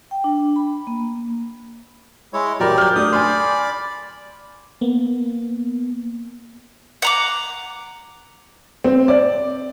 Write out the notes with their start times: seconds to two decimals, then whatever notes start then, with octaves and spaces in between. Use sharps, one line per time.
0.11 G5
0.24 D4
0.56 B5
0.87 A#3
2.33 G#3 E4 C#5
2.60 D#1 F#3 G4 A#4 D5
2.78 F6 G6
2.96 A3 D4 D#6
3.13 D5 G#5 B5 C6
4.81 A#3 B3
7.02 F#5 A#5 D6
8.84 C4
9.08 D5